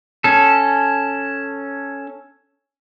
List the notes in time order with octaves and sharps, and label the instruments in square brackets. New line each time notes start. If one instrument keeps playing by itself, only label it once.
[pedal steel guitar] C#4 A4